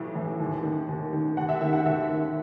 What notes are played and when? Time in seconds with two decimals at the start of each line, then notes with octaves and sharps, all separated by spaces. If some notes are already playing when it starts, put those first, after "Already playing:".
Already playing: B1 A2 E3
0.15 A2 E3
0.40 D#2
0.63 D#3
0.88 D#2
1.13 D#3
1.37 D#2 F#5
1.49 E5
1.61 D#3 E5
1.73 F#5
1.86 D#2 E5
2.10 D#3